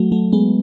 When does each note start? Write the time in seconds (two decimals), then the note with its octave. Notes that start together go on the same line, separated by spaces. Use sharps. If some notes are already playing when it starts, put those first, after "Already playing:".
Already playing: F#3 A3
0.12 F#3 A3
0.32 G#3 B3